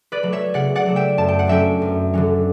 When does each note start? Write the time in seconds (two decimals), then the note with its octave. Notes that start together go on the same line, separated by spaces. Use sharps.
0.12 B4 D5
0.23 F#3 A3
0.32 C#5 E5
0.54 C#3 D5 F#5
0.75 D5 F#5
0.86 F#3 A3
0.96 E5 G5
1.18 F#2 A5
1.28 G5
1.39 F#5
1.48 D3 F#3 C#4 E5 G5
1.82 F#2
2.14 D3 F#3 C#4